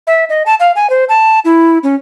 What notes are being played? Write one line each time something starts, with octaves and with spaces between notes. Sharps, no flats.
E5
D#5
A5
F5
G#5
C5
A5
E4
C#4